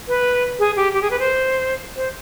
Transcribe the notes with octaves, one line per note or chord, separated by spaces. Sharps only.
B4
G#4
G4
G4
G#4
B4
C5
C5